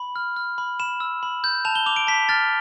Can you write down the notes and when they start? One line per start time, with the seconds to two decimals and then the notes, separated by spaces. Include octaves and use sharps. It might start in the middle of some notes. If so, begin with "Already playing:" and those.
Already playing: B5
0.16 F6
0.36 F6
0.58 B5
0.80 B5 E7
1.00 E6
1.23 B5
1.44 G6
1.65 A5 F7
1.75 G7
1.86 D6 F7
1.96 D7
2.07 A5 B6
2.29 F6 A6